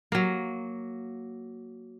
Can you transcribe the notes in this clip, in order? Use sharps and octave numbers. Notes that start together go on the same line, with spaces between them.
F#3 A#3